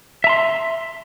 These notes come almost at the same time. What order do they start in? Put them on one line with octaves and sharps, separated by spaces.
E5 A#5 C6